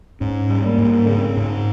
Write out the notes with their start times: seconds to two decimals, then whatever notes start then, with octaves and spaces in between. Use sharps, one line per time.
0.21 G#2 C#4
0.50 G3
0.63 A#3
0.78 G#2
1.07 C#3 C4
1.37 G#2